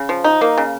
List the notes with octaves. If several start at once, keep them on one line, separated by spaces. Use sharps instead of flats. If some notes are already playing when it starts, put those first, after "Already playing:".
Already playing: C#3
F3
D#4
A#3
C#3